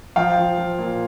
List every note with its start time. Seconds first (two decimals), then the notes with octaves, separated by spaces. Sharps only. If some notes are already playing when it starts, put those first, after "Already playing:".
0.16 F3 F5 G5
0.37 F3
0.58 F3
0.79 A#2